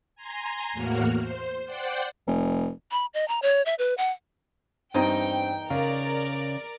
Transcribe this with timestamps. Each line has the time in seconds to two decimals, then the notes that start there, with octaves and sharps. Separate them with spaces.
0.16 G#5 A#5 C6
0.73 E2 A2 A#3 F#4 F6
1.20 C5
1.66 C5 D5 F#5 G5
2.27 F1
2.91 B5
3.14 D#5
3.28 A#5
3.42 C#5
3.65 E5
3.79 B4
3.97 F#5
4.94 E2 G2 C4 D#4 G5
5.70 C#3 A#4 D5 F5